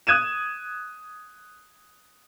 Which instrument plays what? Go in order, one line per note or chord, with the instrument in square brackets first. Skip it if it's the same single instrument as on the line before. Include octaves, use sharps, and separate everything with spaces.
[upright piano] D#6 F#6 G#6 D#7 E7